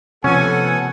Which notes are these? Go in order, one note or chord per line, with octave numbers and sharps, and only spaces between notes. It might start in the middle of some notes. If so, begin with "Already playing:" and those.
C3 F3 B3 C#4 A4 F#5 G#5